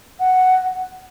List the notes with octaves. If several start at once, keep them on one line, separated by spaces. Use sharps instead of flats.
F#5